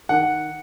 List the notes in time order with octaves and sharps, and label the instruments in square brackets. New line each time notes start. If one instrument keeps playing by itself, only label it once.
[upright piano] D#3 F#5